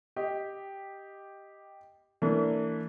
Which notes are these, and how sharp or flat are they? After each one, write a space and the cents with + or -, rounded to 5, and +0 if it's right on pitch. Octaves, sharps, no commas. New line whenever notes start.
G4 +0 D#5 +5
E3 -25 A#3 -45 D4 -40